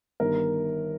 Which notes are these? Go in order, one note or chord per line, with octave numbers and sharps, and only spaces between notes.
G1 G2 D#3 A#4